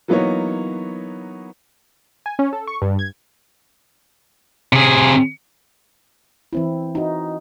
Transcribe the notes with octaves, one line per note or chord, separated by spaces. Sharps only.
E3 F#3 A#3 B3 D#4 C#5
G#5
C#4
A4
C#6
G2
G#6
C3 G#4
E3 C4 E4
D#4 F#4